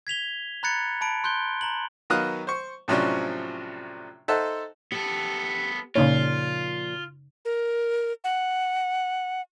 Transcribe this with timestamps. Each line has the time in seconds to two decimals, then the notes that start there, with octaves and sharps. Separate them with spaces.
0.07 G#6 B6 F7 G7
0.63 A#5 B5 F#6 G#6 A6 C#7
1.01 A5 B5 D7
1.24 C6 F#6 G6 G7
1.61 A#5 F#7
2.10 D#3 F#3 B3 F5 D#6 F#6
2.47 C5 C#6
2.88 A2 C3 F3 F#3 C#4 D4
4.28 D#4 A4 C5 E5 F#5 A5
4.92 B3 G4 A4
5.96 A#2 C#3 F3 D#4 F4 C#5
7.45 A#4
8.24 F#5